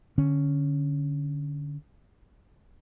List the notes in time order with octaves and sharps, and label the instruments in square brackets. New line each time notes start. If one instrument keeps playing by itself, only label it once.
[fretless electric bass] D3 C#4